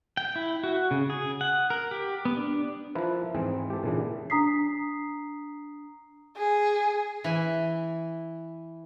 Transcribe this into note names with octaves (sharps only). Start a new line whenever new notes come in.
G5
E4
F#4
C#3
G#4
F#5
A#4
G4
B3
D4
F3 E4 A#4 B4
G#2 E3 C4 D#4 G#4
G4 A4
A#2 C#3 E3 G#3 D4
D4 A#5 D#6 B6 C7
G#4
E3 G#5